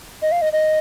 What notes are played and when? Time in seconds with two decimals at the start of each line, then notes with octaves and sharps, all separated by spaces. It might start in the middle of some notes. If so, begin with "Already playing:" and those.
0.22 D#5
0.32 F5
0.42 D#5
0.53 D#5